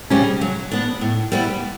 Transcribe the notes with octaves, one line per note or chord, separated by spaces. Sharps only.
C#3 G3 C#4 G4
F#3
B3 D4
A2
G3 B3 E4